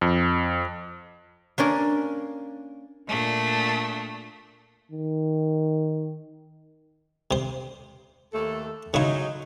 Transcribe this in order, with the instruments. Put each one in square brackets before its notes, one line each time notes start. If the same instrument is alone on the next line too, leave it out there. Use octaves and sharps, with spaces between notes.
[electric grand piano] F2
[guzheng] A#3 C#4 D4 A#4
[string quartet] A#2 A3 D4
[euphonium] D#3
[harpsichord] C3 C5
[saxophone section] D#2 A3 A4
[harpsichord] C#3 E4 [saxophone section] F#3 G#3 D#4